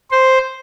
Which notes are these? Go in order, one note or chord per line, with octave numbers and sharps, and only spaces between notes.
C5